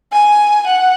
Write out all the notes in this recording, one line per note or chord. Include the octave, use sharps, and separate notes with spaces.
G#5
F#5